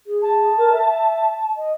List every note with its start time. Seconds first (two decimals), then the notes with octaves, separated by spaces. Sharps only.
0.06 G#4
0.22 A5
0.57 A#4
0.72 E5
1.56 D#5